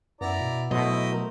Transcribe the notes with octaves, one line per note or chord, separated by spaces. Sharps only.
F#2 B3 E4 D5 A#5
B2
B2 F#3 A3 E4 C5 D#5 E5
A3 A#4